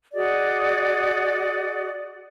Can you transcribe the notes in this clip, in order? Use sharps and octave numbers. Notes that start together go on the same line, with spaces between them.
F#4 G#4 D5 D#5